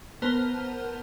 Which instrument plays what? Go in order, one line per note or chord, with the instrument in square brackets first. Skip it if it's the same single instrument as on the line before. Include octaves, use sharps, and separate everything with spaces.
[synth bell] B3 A#4 C5 A5 F6